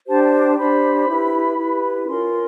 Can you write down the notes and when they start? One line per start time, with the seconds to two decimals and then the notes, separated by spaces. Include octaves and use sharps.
0.07 D4 G4 C5 A5
0.24 A5
0.40 A5
0.57 D4 G4 C5 B5
1.08 E4 G4 B4
1.57 E4 G4 B4
2.07 C#4 F4 A#4 C6